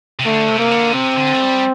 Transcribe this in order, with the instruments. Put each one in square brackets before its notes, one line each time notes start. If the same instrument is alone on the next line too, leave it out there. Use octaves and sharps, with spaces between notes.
[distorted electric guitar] C3
[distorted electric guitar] D3 [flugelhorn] A3
[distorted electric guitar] C3
[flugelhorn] A#3
[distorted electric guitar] D3
[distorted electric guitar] C3 [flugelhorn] C4
[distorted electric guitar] D3
A3
G3